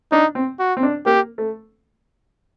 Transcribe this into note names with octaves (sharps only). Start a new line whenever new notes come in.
D4 D#4
C4
F#4
C4
D4
A#3 G4
A3